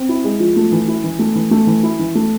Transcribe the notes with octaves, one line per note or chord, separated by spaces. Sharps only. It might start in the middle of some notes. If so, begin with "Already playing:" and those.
Already playing: C4
E4
G#3
F3
A3
E3
E4
E3
A3
E3
A3
E3
E4
E3
A3